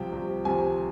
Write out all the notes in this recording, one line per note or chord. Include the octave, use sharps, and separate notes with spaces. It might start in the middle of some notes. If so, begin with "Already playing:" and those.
Already playing: C2 C3 F3 G5
C2 C3 F3
C2 C3 F3 G#5